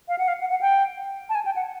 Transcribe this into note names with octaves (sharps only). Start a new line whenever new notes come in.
F5
F#5
F5
F#5
F#5
G5
A5
G#5
G5
F#5